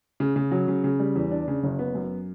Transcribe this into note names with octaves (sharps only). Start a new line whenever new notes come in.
C#3
C#3
F#3
C#3
C#3
G3
E2
D4
C#3
F#1
B3
F#2